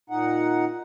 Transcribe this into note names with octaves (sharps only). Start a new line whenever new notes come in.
A#2 D#4 F#5